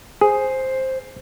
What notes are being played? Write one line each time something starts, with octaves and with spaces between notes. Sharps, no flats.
G#4 C5